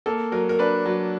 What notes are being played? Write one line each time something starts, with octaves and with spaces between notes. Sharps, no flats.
A#3 A4
F#3 A#4
A#4
D4 B4
F#3